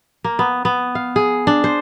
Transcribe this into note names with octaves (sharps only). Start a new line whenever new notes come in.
A#3
B3
B3
F5
G#4
D4
C5